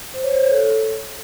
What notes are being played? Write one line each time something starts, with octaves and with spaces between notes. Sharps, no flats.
C5
C#5
C5
C#5
A4